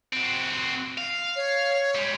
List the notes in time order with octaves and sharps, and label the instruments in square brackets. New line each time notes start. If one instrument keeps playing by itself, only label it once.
[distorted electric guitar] C4 F#4
F5
[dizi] C#5
[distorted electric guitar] G3 G#3